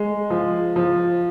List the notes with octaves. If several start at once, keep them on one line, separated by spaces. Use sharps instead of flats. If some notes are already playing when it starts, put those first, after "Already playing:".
Already playing: G#3
F3
F3